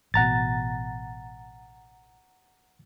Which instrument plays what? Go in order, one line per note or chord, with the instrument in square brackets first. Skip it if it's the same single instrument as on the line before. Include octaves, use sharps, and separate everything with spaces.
[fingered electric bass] A1 B2 [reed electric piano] F#5 A#5 A6